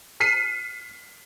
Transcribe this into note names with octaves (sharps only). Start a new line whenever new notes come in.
F6 B6 C7 D#7